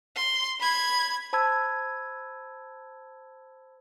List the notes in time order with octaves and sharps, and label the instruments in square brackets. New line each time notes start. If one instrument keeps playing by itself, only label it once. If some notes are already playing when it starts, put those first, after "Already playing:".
[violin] C6
B5 G#6
[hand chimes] C5 A5 B5 E6 G#6